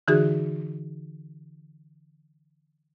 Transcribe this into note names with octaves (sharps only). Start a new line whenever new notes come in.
D3 E3 D#4 F#4 G#4